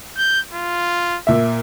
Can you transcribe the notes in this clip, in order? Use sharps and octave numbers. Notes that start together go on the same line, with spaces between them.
G6
F4
A#2 E5